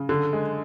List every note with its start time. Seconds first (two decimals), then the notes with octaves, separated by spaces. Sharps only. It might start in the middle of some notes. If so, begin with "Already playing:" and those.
Already playing: C#3
0.09 D3
0.33 G#3